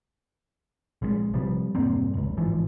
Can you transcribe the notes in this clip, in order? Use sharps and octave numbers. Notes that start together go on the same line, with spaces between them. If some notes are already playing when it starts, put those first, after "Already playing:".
A#1 D3 G#3
C3 F3 G3
E1 G2 A#3 C4
F1 C#2
A1 G#2 E3 F3